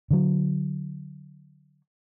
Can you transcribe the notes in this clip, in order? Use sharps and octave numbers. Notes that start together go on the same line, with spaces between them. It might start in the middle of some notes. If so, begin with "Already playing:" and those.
D3 F#3